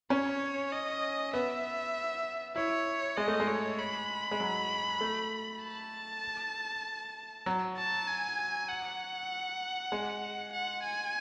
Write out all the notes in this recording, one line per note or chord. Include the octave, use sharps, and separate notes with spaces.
C#4 C#5
D#5
B3 E5
E4 C#5
G#3 D#5
A3
G#3
C#5
B5
G#3
F#3
A3
A5
F#3
A5
G#5
F#5
G#3
F#5
G#5